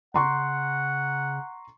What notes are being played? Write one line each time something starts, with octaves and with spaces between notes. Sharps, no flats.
C#3 F#5 A#5 C6 C#6